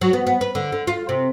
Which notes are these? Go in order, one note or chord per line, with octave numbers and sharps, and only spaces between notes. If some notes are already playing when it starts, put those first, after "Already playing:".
F#3
B3
B3
B4
D3
D3
F4
C3